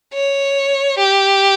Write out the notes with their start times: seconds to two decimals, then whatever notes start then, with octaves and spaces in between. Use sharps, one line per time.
0.14 C#5
0.98 G4